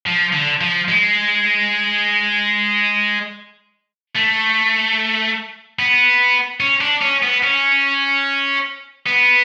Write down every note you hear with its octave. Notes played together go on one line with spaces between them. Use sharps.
F3
D3
F3
G#3
A3
B3
C#4
D4
C#4
B3
C#4
B3